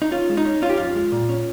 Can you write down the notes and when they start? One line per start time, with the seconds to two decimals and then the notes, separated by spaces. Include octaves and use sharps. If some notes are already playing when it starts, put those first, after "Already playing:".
0.02 D#4
0.11 C#4 F4
0.29 G#3
0.37 D#4
0.45 C#4
0.62 C#4 F4
0.70 G4
0.77 F2 F4
0.95 G#3
1.12 A#2
1.29 C#4